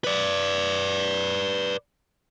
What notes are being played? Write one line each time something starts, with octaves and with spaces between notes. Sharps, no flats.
B4 D5